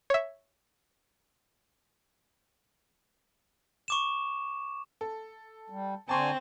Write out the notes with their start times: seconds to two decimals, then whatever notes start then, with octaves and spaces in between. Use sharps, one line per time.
0.10 C#5 E5
3.88 C#6 D6 E7
5.01 A4
5.70 G3
6.09 D3 C4 G#5 A5 C6 C#6